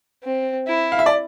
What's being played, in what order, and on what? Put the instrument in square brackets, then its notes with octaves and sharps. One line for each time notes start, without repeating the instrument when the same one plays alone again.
[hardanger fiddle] C4
E4
[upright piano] F5
E5
D5